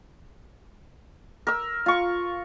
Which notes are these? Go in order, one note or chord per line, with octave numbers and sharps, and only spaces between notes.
A#4 E6
F4 C#6